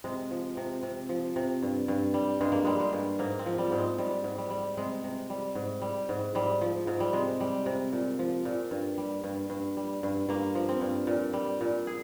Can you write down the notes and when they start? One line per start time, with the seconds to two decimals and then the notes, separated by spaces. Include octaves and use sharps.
0.04 C3 G#3
0.31 F3
0.57 C3
0.83 C3
1.09 F3
1.36 C3
1.62 G2
1.88 G2
2.14 G3
2.41 G2 G#3
2.52 A#3
2.65 G3 G#3
2.80 G#3
2.93 G2
3.19 G#2 A#3
3.39 C4
3.46 F3
3.58 G3
3.72 G#2
3.78 G#3
3.98 G#2 G3
4.24 G#2
4.38 G3
4.50 G3
4.77 C3 G#3
5.04 C3
5.30 G3
5.55 G#2
5.82 G3
6.09 G#2
6.35 G#2 G3
6.61 F3
6.87 G#2
7.00 G3
7.13 C3 G#3
7.40 G3
7.66 C3
7.93 A#2
8.19 F3
8.45 A#2
8.71 G2
8.98 G3
9.24 G2
9.50 G2
9.77 G3
10.03 G2
10.29 G2 A#3
10.55 F3
10.69 C4
10.81 G2
11.07 A#2
11.33 G3
11.61 A#2
11.87 G#4